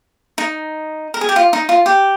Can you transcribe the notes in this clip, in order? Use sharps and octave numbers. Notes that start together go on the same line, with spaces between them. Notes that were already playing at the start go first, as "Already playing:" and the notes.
D#4
A#4
G#4
G4
F4
D#4
F4
G4